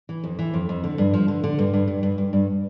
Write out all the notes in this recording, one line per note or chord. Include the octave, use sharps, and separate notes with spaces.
E3
F2
E3
F2
F2
D3
G2
F3
D3
D3
G2
G2
G2
G2
G2
G2